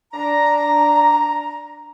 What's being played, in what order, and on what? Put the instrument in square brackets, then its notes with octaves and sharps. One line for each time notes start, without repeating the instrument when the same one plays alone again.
[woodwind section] D4 A#5